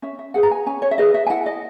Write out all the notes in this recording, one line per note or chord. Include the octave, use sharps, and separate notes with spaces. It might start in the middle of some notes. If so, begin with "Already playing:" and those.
C#4 E5
E5
G#4 B4 F#5
A#5
G#5
C#4 G#5
C#5
E5
G#4 B4 D#5
E5
G#5
E4 F#5
D#5